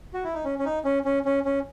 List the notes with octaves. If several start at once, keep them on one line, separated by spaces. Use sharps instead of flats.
F#4
E4
D#4
C#4
C#4
D#4
C#4
C#4
C#4
C#4